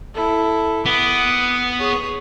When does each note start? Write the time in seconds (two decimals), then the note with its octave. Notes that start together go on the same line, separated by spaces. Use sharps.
0.15 E4 A4
0.86 B3 D6 D#6
1.79 G#4 C#5